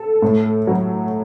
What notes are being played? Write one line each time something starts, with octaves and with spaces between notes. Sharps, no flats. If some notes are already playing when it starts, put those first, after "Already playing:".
Already playing: A4
A2
F#3